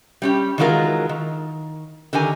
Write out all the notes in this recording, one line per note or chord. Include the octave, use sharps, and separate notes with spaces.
G3 C#4 G4
D#3 E3 F#3 G#3 F4 A#4
D#3
D3 D#3 G4 A#4 G#5